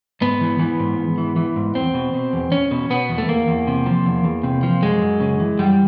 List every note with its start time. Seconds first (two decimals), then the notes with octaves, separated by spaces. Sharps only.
0.21 G#2 B3
0.41 E3
0.59 E3
0.79 G#2
0.99 G#2
1.18 E3
1.36 E3
1.56 G#2
1.75 E2 C4
1.94 B2
2.14 B2
2.33 E2
2.52 E2 C#4
2.71 B2
2.90 B2 B3
3.09 E2
3.18 A3
3.28 E2 A#3
3.48 E2
3.67 C3
3.86 F3
4.05 E2
4.24 E2
4.44 C3
4.63 F3
4.82 F#2 G#3
5.01 F#2
5.20 C#3
5.39 E3
5.59 F#2 G3